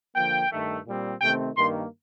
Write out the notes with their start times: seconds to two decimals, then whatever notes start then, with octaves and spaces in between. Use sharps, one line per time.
0.16 D3 F3 A#3 G5
0.51 G2 D#3 A3
0.86 A#2 G3 C4
1.21 C3 D#3 A3 C4 G5
1.57 G2 D#3 A#3 C6